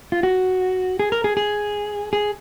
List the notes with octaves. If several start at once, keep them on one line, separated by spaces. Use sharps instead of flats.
F4
F#4
G#4
A#4
G#4
G#4
G#4